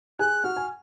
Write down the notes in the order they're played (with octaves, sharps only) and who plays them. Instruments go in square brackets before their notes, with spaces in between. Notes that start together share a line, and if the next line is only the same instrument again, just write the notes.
[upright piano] G#4 G#5 [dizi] F#6
[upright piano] F#4 F#5 [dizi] F6
[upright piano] G#5